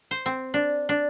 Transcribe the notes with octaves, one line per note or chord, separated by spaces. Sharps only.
C5
C4
D4
D4